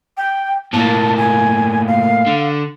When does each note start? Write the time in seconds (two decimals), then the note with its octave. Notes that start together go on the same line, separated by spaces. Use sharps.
0.17 G5
0.73 A2 A#3 A5
1.17 G#5
1.87 F5
2.27 D3